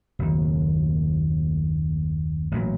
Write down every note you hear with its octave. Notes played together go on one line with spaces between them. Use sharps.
F#1 D#2
A1 A#2 F#3